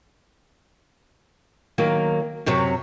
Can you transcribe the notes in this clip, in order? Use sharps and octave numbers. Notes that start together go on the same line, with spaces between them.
D#3 F#3 A#3
F#2 C3 F#3